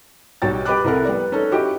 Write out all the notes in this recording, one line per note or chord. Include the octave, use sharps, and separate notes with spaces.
B1 G3 F#4 G5 A6
G4 B4 D#5 B5 D6 F#6
C2 E4 A4 A#4
G3 B3 D5
C#4 D#4 A4
E4 F#4 G4 D#5